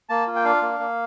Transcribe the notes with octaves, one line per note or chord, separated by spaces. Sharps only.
A#3 A5
F4
G5
D4 F5
A#3
A#3